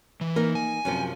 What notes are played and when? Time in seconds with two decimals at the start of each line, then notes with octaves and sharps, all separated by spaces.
0.21 E3
0.36 A#3 D#4 A#4
0.55 G#5
0.85 F#2 C3 F3